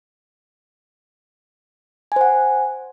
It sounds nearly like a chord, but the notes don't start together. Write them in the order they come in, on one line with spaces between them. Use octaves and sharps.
G#5 C5 F#5